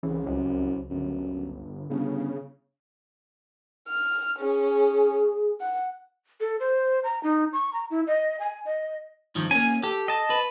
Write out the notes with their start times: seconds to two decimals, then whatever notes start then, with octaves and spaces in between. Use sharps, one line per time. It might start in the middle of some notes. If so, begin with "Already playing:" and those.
0.03 C2 C#3 E3
0.26 C#2 F#2
0.90 G1 F#2
1.90 G1 C#3
3.89 F6
4.40 C#4 G#4
5.60 F#5
6.40 A4
6.60 C5
7.04 A#5
7.23 D#4
7.53 C#6
7.73 A#5
7.90 E4
8.07 D#5
8.40 G#5
8.66 D#5
9.35 G2 D#3 F3
9.51 A#3 C#4 G#5
9.83 G4 A4
10.08 D#5 A5
10.30 B4